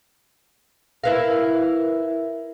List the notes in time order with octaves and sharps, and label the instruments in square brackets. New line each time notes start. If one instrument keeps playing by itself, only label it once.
[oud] E4 B4 F5 [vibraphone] A#4 E5